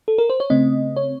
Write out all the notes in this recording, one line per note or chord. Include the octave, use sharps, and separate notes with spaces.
A4
A#4
C5
C#5
C#3 A3 C4 D#5
C#5